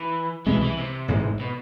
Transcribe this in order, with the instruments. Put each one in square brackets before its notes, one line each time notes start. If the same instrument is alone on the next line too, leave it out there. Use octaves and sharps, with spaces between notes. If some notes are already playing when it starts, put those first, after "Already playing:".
Already playing: [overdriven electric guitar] E3
[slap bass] C2 B2 G#3 C4 [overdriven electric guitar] E3
[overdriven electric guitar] E3
C3
[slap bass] A1 G#2 E3 G#3
[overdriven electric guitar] B2